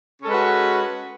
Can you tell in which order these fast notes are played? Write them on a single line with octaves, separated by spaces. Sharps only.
C#4 A4 G#3 B4 F#4